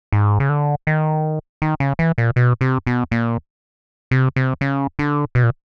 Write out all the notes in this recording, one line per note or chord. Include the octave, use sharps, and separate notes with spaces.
G#2
C#3
D3
D#3
D#3
C#3
E3
A#2
B2
C3
B2
A#2
C3
C3
C#3
D3
B2
A#2